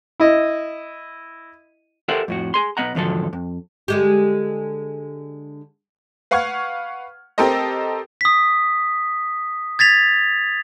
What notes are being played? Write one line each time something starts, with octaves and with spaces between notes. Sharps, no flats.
E4 D#5
G4 A4 A#4 C5 E5 F#5
F2 A2 F#4
G#4 C6
B1 B3 D#5 F#5 A#5
E2 G#2 D3 F3 F#3 A4
F2
D3 G#3 G4
B4 F5 F#5 C#6 F6 G#6
C4 G4 A4 A#4 C5 D#5
D#6 B6
G#6 A6 B6 F7